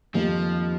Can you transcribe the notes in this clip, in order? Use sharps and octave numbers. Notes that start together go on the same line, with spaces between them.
F2 D#3 F3 G3 A#3 D#4